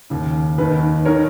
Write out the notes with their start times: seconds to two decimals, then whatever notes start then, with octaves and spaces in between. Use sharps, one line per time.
0.10 D#2 C#3
0.58 D#2 D#3 B4
1.05 D#3 A#4 C#5